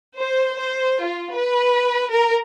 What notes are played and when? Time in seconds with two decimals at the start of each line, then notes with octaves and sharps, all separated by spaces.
0.16 C5
0.55 C5
1.02 F4
1.34 B4
2.10 A#4